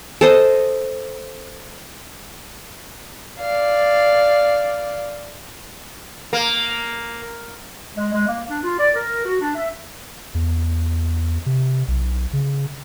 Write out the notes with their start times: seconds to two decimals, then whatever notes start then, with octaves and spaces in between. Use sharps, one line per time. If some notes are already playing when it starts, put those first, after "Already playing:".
0.21 A4 C5 D#5
3.39 D5 F5
6.33 A#3
7.96 G#3
8.13 G#3
8.27 A#3
8.48 D4
8.63 F4
8.78 D5
8.95 A#4
9.25 F#4
9.40 D4
9.54 E5
10.34 E2
11.46 C3
11.88 B1
12.33 C#3